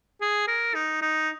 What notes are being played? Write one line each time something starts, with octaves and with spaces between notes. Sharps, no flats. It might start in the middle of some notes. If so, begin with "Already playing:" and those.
G#4
A#4
D#4
D#4